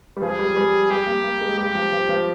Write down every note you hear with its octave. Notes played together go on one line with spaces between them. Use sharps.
G3
F3 G#4
G3
G3
G3 G4
A#3
A#3
G#3
G3 G4
F3
F3
F3